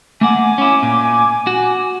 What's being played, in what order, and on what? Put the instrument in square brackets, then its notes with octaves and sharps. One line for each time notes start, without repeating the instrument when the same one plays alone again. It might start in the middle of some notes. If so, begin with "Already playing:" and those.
[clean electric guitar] A3 A#3 F#5 [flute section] G#5 D6
[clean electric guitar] C#4 E4
A#2
F#4